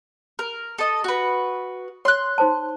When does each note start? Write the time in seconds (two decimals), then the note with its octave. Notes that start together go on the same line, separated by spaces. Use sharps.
0.39 A#4
0.78 A4 D#5
1.04 F#4 B4
2.05 C#5 C6 F#6
2.38 D#4 C5 A5